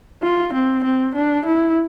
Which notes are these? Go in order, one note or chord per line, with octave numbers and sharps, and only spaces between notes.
F4
C4
C4
D4
E4